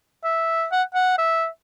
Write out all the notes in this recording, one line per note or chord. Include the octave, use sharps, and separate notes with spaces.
E5
F#5
F#5
E5